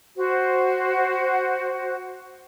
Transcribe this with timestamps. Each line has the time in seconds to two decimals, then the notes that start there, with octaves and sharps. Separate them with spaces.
0.17 F#4 C5